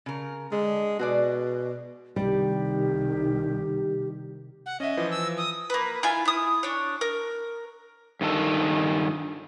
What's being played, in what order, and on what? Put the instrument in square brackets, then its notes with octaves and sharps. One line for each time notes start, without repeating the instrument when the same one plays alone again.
[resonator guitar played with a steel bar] C#3 A#4
[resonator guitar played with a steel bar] D3 [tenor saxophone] G#3
[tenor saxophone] B2 [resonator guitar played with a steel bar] F#4 G#4 D5
[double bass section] C2 D#3 [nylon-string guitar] G3 [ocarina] G4
[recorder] F#5
[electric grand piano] C#4 E5 [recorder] D#5
[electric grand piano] E3 F3
[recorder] E6
D#6
[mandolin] A#3 B4
E4 F4 G#5
E4 D#6
D4 C#5
A#4
[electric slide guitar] G2 D#3 A4